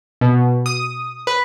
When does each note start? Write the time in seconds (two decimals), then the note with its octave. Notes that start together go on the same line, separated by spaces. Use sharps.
0.21 B2
0.66 D#6
1.27 B4